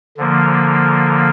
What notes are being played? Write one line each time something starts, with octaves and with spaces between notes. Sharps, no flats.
D3 F3 A#3